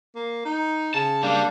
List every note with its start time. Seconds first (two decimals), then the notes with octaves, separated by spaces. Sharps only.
0.15 A#3
0.45 D#4
0.94 C#3 A5
1.23 G3 A#3 D4